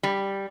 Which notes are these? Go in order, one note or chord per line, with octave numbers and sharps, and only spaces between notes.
G3